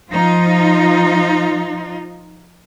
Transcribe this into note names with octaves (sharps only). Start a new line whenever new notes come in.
F3 D#4 F4